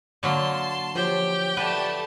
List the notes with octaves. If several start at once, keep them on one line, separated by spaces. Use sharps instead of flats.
D3 F#3 A#3 A5 C6
F3 G4 C#5 G5
A3 B4 D5 F#5 A5